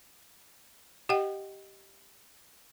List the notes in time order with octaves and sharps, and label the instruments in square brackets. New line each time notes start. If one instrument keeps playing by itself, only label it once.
[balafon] G4 D#5 F#5 G5